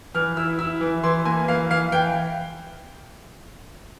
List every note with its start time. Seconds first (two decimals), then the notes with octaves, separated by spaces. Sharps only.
0.14 E3 F6
0.37 E4 E6
0.59 E4 E6
0.81 E3
1.03 E3 C6
1.25 A#3 G#5
1.48 E3 F5
1.70 E3 F5
1.92 E3 G5